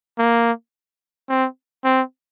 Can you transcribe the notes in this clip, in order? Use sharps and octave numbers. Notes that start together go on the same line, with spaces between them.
A#3
C4
C4